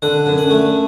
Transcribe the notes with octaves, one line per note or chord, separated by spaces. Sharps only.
D3 F#5
F#2
F#5
A3